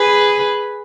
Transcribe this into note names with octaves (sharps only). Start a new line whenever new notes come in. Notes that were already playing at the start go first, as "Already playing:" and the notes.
Already playing: G#4 B4